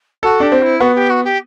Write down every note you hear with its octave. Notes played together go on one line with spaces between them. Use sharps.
F#4 A4
D4 G4
C4
E4
B3 F#4
G4
F#4
G4